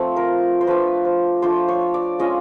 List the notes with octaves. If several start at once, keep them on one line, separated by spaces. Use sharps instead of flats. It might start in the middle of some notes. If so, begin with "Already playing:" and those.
Already playing: F3 A3 C4
A#4
C5
F3 A3 D4 B4
C5
F3 A3 D4 C5
C#5
D5
G#3 C#4 F4 D#5